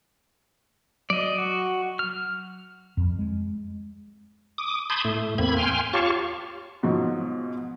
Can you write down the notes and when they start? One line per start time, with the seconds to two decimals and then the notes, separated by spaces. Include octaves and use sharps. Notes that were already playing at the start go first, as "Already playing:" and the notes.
1.10 F#3 D5 D#5
1.38 F#4
1.99 F6
2.97 F2
3.19 G#3
4.58 D6 D#6
4.90 A5 B5 C6 D#6 G6 G#6
5.05 A2 A3
5.38 E2 A#3 C4 B5 G#6
5.57 G5 G#5 C6 F6
5.93 F4 G4 C#5 F5 A5 C#6
6.83 G#2 B2 F3 F#3